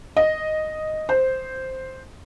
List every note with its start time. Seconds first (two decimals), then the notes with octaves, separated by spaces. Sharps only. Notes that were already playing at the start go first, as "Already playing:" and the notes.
0.17 D#5
1.09 C5